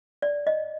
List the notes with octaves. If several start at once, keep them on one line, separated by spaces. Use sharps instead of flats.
D5
D#5